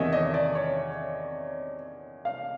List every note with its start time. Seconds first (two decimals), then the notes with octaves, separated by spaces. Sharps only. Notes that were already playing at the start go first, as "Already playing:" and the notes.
Already playing: E2 C3 D#3 C#5 D#5 E5
0.13 D#5
0.34 D5
0.55 C#5
2.25 F5